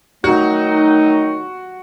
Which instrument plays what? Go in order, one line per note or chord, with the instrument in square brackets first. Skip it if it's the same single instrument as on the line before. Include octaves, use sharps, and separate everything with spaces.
[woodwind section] D#3 F#3 A3 D#4 [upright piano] F#4